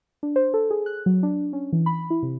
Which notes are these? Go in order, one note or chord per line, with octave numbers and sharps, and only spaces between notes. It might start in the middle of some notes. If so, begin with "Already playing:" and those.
D4
C5
A4
G#4
F#6
F#3
D4
C#4
E3
B5
E4
C3